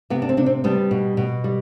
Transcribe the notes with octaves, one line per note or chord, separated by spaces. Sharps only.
C3 B3
D4
C4
C3 D4
C4
G3 B3 D4
B2
B2
G3